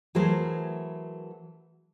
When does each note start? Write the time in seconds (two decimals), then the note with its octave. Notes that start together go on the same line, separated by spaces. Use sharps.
0.15 E3 F#3 A3 G#4 A#4 C5